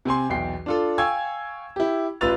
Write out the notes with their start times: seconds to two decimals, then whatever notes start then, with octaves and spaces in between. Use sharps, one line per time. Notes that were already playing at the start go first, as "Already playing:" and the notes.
0.05 C3 C4 G#5 C6
0.29 B1 E2 G5 C7
0.66 D4 F4 A4
0.98 F5 G5 G#5 C#6 E6 G#6
1.76 E4 G4
2.21 A1 F4 B4 E6 A6 F7